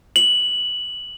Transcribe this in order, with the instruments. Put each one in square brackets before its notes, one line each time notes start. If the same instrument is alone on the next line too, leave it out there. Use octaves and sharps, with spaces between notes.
[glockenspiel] F#7